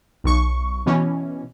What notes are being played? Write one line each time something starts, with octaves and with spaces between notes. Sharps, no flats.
B1 C#6
B2 E3 C#4